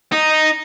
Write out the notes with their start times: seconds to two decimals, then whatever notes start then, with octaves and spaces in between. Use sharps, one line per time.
0.12 D#4